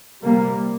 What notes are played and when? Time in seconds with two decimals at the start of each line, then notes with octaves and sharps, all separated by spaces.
0.23 C3 G3 A#3